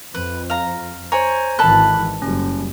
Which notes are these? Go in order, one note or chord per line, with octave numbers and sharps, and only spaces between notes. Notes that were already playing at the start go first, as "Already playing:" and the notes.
F2 B4
F5 A#5
C5 C#5 G#5 A#5
G#1 D#3 E3 A4 A5 B5 F#6
F#1 G3 C#4